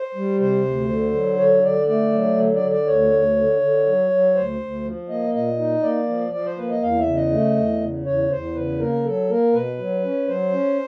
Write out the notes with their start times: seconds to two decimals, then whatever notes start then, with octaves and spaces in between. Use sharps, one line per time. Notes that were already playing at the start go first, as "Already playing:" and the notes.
Already playing: C5
0.15 G3
0.40 C3 C5
0.65 D2
0.89 D3
1.14 F#3
1.38 D3 C#5
1.63 D3 D5
1.87 A3 D5
2.12 F#3
2.37 D3
2.54 D5
2.62 D3
2.71 D5
2.86 D2 C#5
3.12 D2
3.36 D3
3.61 D3
3.86 F#3
4.11 F#3
4.35 D2 C5
4.60 D2
4.84 F3
5.09 A#3 D#5
5.34 A#2 D#5
5.58 D#4
5.83 A#3 D5
6.09 F3
6.33 F3 D5
6.45 C5
6.57 A#3 B4
6.70 D#5
6.82 E2 F5
6.99 E5
7.07 C#3
7.15 D#5
7.31 A3
7.56 E2
7.80 C#3
8.06 E2 C#5
8.30 E2 C5
8.55 C#3 B4
8.80 A#3 A#4
9.04 F#3 A4
9.30 A#3 A#4
9.53 B2 B4
9.78 F#3
10.04 C#4
10.28 F#3 C5
10.52 C#4